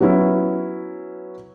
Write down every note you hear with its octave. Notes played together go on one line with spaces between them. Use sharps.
F#3 B3 C#4 E4